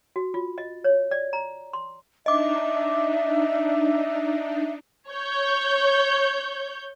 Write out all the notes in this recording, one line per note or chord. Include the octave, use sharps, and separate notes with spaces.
F#4
F4
D#5
C#5
D5
A#5
C6
D4 D#4 D#5 E5 D6
C#5 G6